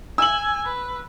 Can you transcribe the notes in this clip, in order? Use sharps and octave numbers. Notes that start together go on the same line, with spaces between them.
G#5 E6 F#7
B4